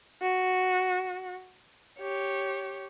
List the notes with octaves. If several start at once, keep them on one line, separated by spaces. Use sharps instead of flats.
F#4
G4 C#5